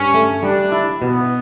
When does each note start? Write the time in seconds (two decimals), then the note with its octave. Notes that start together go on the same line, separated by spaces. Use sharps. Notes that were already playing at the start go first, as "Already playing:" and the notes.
Already playing: G2 C#4
0.14 A3
0.43 G3 D4
0.72 E4
1.02 B2 B3